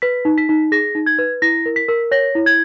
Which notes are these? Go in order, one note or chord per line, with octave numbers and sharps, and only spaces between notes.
B4 B6
D#4
B6
D#4
G#4 A#6
D#4
G#6
B4
E4 A#6
A#4
B6
A#4
C#5 A#6
E4
G#6